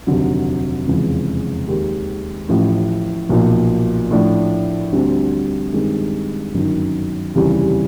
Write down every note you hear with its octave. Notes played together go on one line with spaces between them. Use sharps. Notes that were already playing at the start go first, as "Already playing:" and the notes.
F1 D#2 D3 F#3
F1 E2 C#3 F3 G#3
D#2 D#3 G#3
A1 A2 F3
B1 A#2 F3
A2 F3 A3 D4
D2 D3 G3 C4
G2 D#3 G#3 C4
G1 F#2 D#3
F1 D#2 C#3 E3 G3